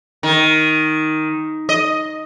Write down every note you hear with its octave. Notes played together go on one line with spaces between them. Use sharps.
D#3
D#5